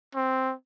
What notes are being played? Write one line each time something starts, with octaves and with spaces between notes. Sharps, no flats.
C4